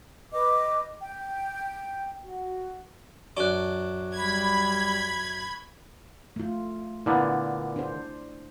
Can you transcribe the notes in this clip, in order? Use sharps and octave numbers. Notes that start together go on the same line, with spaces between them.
B4 D#5 D6
G5
F#4
F#2 D4 C#6 D6 F#6
G3 B5 G#6
A3 F4
A#2 D3 B3 E4
D4 C5